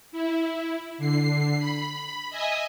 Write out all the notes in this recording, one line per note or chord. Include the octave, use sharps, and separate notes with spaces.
E4
D3 C7
B5
D#5 E5 G#5 D#6